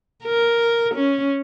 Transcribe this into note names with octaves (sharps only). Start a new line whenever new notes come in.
A#4
C#4